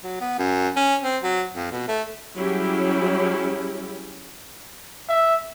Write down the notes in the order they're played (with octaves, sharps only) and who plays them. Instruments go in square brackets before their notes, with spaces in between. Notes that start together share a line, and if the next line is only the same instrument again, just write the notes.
[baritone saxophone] F#3
B3
F#2
C#4
C4
F#3
F2
B2
A3
[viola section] F#3 G3 C#4 E4 G4 G#4
[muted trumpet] E5